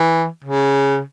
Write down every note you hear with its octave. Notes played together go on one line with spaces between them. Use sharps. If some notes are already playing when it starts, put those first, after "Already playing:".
Already playing: E3
C#3